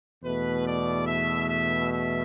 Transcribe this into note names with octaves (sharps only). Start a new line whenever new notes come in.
E2 B2 A3 B4
D5
E5
E5
E5